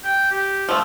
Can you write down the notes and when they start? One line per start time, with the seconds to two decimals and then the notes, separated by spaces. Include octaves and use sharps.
0.05 G5
0.31 G4
0.69 F3 A3